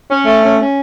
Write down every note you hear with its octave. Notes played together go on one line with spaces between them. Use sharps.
C#4
A3
C#4
C#4